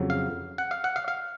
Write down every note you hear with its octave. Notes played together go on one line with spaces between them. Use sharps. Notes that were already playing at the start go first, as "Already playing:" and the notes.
Already playing: F2 C#3 F#3
F5
F#5
F5
F#5
F5
F5